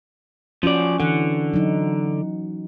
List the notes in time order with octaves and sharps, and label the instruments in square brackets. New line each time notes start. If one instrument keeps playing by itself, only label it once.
[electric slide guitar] F3 D5 [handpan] C#4 F#4
[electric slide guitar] D3 [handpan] E3 F#5
[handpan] F#3 D#4